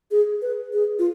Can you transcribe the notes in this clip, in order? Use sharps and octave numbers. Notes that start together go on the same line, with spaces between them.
G#4
B4
G#4
F4